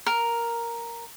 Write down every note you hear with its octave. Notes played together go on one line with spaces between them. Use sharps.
A#4